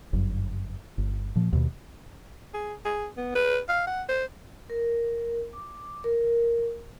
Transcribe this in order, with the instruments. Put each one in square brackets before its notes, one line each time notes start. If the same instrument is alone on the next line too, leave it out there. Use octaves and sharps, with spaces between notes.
[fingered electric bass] G1 F#2
G1
A#2 F3
D#2 B2
[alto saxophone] G#4
G#4
B3
B4
F5
F#5
C5
[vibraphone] A#4
D6
A#4